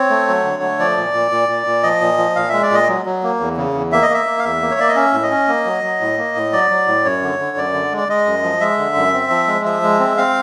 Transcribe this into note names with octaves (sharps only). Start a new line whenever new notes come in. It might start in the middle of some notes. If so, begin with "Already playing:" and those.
Already playing: C4 C#5
A3
F#3
D3
A3
F3 D5
A#2
A#2
A#2
A#2
A#2
F3 D#5
A#2
F3
A#2 F5
G#3 E5
D5
A#2 D#5
F#3
F#3
A#3
E2
C#3
E2
A#3 E5
D#5
A#3 E5
A#3
F5
E2 E5
A#3
C#5
A#3 D5
D#5
C#4 E5
A2
D#5
C#4
A#3
F#3
F#3
A2
A#3
A2
F#3 D5
F#3
A2
F#2 C#5
D3
D3
F#2 D5
D3
G#3
D5
G#3 D#5
F#2
F3
G#3 E5
D3
F#2
C4
F3
G#3
F3 E5
G#3
C4
C4 F5